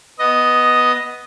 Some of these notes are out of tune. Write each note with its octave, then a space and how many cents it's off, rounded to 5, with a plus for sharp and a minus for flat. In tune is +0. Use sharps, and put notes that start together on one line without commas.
B3 +0 D#5 +0